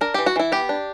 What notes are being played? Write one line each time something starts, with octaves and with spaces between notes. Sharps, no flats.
D4 A#4
E3 G4
F#4
E3 E4
B3 G4
D4